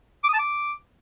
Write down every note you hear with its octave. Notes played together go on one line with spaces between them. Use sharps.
D6
D#6
A5
D6